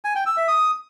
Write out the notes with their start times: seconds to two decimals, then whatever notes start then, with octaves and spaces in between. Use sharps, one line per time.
0.05 G#5
0.15 G5
0.26 E6
0.37 E5
0.48 D#6